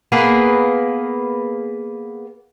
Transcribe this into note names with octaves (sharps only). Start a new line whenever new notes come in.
A#3 B3 G#4 B4